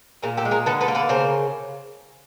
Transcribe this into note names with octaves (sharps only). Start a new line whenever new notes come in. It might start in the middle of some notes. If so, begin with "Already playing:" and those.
A#2 G#4 A#4
G4 A4
G#3
G#4 A#4
D3 A4 B4
A4 B4
A#3
A4 B4
C#3 A#4 C5